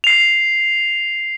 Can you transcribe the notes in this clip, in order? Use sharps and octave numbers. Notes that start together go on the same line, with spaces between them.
C7 F7